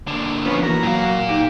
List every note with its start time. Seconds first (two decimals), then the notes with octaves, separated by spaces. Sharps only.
0.08 D3 A#3
0.45 F3 B3 C#4
0.63 E3 A#3 F#4 A#5
0.83 A#2 F#3 F5
1.29 D#4 G4 D6